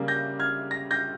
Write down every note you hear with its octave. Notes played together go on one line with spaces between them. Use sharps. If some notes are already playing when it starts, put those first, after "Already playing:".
Already playing: C#3 G3 A#3
G6 A#6
F6 G#6
A#6
G6 A#6